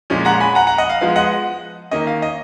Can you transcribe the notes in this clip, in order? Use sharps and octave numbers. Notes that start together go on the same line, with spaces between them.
A#2 F3 G#3 C#4
F#5 A#5
G#5 B5
F#5 A#5
F#5 A#5
D#5 F#5
F5
F3 G#3 B3 F5
D#5 F#5
D#3 A#3 C#4 D#5
F5
D#5